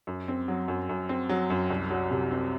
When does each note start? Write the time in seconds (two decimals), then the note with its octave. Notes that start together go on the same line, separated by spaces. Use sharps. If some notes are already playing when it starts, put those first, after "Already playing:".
0.07 F#2
0.28 C4
0.48 F#3
0.68 F#2
0.89 F#2
1.09 C4
1.29 F#3
1.50 F#2
1.70 C2
1.91 F#3
2.11 C3
2.31 C4